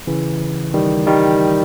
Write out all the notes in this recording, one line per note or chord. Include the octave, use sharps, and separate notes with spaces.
C#3 E3
D#3 G3
D#3 G3